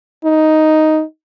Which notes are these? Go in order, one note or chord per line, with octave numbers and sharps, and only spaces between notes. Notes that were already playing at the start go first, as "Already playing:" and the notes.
D#4